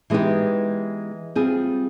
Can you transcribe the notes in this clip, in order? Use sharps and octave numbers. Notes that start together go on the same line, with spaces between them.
E3 G#3 B3 D#4 G4
G3 C4 F4 G#4